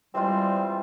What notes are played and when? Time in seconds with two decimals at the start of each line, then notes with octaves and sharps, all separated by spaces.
0.15 E3 G3 G#3 C4 F4